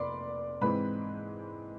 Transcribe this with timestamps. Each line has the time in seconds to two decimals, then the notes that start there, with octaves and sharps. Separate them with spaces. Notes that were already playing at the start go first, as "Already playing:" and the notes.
Already playing: F1 D5 B5 C6 D6
0.61 G#2 E3 G#3 C4 B4 B5